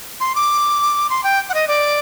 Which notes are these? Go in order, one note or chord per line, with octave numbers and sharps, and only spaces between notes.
C6
D6
C6
G5
F#5
D#5
D5